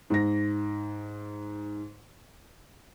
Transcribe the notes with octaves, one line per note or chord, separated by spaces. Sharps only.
G#2 A#6